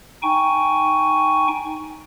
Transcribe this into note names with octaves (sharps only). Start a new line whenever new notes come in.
D#4 G5 G#5 C#6